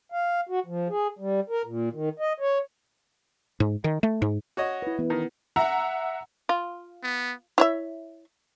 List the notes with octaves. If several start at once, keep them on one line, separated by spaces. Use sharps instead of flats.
F5
F#4
F3
G#4
G3
A#4
A#2
D#3
D#5
C#5
G#2
D#3
A3
G#2
F#4 C#5 D#5
E4 B4
E3 B3
D#3
E5 F#5 A#5
F4
B3
E4 C#5 E5